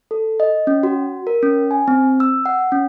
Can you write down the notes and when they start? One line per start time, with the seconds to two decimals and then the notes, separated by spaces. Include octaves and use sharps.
0.11 A4
0.40 D#5
0.67 C#4
0.83 F#4
1.27 A#4
1.43 C#4
1.71 G#5
1.88 C4
2.20 E6
2.46 F#5
2.72 C#4